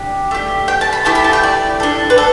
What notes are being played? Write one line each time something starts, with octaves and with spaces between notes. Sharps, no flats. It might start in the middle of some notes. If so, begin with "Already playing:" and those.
Already playing: D4 G4
A3 G4
G5
A5
B5
A3 E4 G4 A5
B5
A5
G5
D5
D4 A4
B4
A4